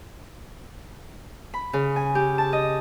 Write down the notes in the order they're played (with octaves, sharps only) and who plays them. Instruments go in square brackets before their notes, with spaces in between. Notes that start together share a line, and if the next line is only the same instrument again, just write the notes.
[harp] B5
C#3
G#5
G4
A5
D#5